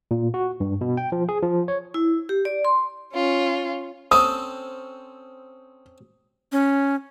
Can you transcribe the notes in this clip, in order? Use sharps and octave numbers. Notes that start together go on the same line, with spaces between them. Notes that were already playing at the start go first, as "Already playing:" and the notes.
A#2
F#4
G2
B2
G5
F3
G#4
F3
C#5
E4
G4
D5
C6
C#4 F4
C4 C#4 A4 D#6
C#4